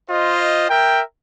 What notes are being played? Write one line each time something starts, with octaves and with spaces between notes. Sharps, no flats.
F4 C5 D#5
A#4 E5 G5